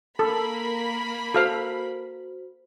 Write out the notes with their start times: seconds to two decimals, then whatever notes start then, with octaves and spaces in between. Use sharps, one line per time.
0.19 A#3 A4 A#4 B5
1.34 F#4 A4 C5 F5